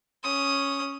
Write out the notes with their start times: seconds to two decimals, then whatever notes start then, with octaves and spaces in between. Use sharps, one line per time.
0.23 C#4 D#6